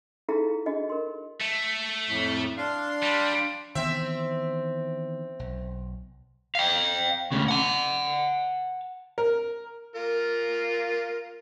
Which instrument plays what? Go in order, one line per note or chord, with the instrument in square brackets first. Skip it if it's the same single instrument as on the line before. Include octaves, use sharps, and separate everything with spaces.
[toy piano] D#4 E4 G#4 A4 F5 A#5
D4 F#4 G#4 D#5
A#4 C6
[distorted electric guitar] A3
[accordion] F2 A2
D4 F5 C6
[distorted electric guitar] G3
[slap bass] D#3 E3 B3 [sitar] C4 E5
[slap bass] B1
[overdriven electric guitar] F5 G5
D2 C#3
F#5 A5
[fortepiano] A#4
[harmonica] F4 A#4